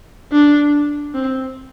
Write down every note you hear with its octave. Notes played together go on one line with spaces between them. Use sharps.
D4
C4